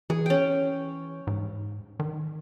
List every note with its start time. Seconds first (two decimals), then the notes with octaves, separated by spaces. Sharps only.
0.10 E3 G#4
0.26 C#4 G5
1.27 G#2
2.00 D#3